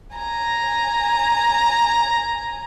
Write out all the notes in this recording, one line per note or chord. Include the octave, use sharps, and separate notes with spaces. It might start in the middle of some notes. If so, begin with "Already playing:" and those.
G#5 A#5